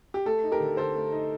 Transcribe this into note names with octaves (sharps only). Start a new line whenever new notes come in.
G4
A3 A4
D#4
G4 A#4
D3
D3 A4 C5
A3
D#4